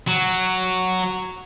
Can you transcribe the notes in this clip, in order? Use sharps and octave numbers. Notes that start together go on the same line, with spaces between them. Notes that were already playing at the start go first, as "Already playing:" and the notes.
F#3